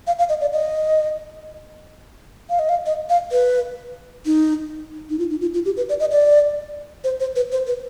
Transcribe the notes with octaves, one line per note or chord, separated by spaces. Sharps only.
F5
F5
D#5
D5
D#5
F5
D#5
F5
D#5
F5
B4
D#4
D#4
F4
D#4
F4
F4
G4
B4
D5
D#5
D5
C5
C5
B4
C5
B4